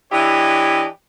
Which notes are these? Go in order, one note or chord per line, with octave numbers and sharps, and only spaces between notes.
E3 D4 E4 G4 C#5 D#5